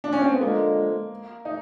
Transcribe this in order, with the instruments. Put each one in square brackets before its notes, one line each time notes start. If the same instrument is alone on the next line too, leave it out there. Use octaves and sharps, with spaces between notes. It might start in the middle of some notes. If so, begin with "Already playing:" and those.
[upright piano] D4
C#4
C4
B3
[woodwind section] D3 F3 G#3 [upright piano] A#3
[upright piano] D#4